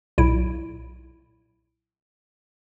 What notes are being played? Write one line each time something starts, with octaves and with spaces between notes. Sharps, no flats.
B1 A#2 E4 D7